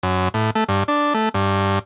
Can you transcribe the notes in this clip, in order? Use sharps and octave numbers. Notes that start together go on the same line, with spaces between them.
F#2
A2
A3
G2
D4
A3
G2